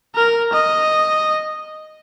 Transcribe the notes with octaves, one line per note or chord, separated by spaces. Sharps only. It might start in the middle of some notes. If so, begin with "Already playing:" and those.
A#4
D#5